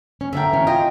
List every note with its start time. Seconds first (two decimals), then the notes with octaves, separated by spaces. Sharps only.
0.21 C#4
0.33 D3 D4 A#4 E5 G5
0.49 B2 E3 C#4
0.67 F4 D#5 G5